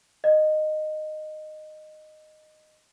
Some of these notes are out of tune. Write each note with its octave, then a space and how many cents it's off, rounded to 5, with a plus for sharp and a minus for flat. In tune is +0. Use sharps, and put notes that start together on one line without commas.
D#5 -15